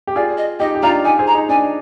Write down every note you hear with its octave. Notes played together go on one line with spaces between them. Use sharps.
G4
F4 G#4 D5
D#5
D#4 G4 D#5
G4
D4 F4 A#5
D#4 G4 G#5
G#4 C5
A#5
D#4
D4 G#5